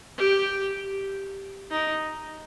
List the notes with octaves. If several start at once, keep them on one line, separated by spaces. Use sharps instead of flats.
G4
D#4